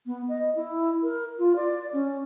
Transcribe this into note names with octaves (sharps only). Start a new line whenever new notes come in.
B3
D#5
E4
A#4
F4
D5
C#4